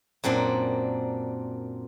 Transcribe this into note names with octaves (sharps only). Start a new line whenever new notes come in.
F#2 A#2 C4 D4